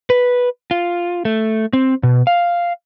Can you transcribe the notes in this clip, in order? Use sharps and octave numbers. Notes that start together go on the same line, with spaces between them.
B4
F4
A3
C4
B2
F5